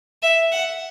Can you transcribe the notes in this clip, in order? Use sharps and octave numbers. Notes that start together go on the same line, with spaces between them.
E5
F#5